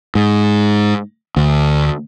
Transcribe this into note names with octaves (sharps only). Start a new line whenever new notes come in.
G#2
D2